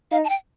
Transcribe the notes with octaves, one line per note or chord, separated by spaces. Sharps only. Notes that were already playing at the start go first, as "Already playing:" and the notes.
D#4 F5
A5
G5